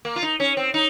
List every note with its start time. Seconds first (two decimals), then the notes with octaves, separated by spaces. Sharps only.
0.05 A#3
0.16 F4
0.22 D#4
0.40 C#4
0.57 C4
0.74 D#4